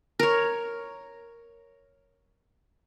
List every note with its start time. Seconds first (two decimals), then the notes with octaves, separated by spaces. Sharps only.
0.19 A#4 C#5